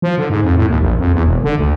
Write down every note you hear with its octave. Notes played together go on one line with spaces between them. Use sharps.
F3
D3
G#2
F2
A2
D#2
A#1
F2
E2
E1
D3
D2